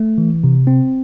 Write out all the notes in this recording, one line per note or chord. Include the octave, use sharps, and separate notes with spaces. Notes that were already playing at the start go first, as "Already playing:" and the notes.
Already playing: A3
E3
C3
C4